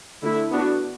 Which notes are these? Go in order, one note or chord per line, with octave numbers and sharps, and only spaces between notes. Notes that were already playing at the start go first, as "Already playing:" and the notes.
D3 A3 E4
B3 D4 F#4